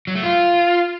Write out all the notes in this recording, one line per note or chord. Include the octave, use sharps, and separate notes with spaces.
F#3
A3
F4